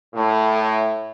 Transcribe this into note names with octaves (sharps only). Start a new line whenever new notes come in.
A2